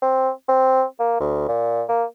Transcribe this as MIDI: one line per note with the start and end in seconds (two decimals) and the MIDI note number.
0.02 0.30 60
0.48 0.84 60
1.00 1.16 58
1.20 1.44 38
1.48 1.84 46
1.89 2.05 58